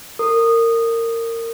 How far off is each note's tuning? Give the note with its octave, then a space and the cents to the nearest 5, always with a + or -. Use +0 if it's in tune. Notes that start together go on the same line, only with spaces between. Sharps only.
A#4 -25 D#6 -15